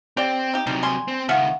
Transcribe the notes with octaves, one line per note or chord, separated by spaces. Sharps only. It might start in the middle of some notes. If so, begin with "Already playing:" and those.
C4 G4 D5 G5
D#4 G4
C3 E3 F#3 G3 D#4
G3 G#5 C6
C4
C#2 D#3 F4 E5 F#5